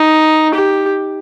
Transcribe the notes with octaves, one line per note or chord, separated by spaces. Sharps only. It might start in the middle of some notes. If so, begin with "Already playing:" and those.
Already playing: D#4
G4